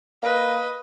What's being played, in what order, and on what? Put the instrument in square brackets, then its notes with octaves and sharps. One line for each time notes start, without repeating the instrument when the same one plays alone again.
[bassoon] A#3 [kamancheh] B4 D#5